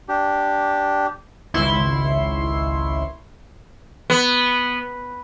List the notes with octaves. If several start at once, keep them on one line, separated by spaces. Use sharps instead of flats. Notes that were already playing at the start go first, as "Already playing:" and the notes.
D4 G4
G#1 C#2 E4 C6 C#6
B3